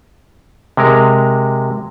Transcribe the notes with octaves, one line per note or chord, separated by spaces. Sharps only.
C3 G#3 A#4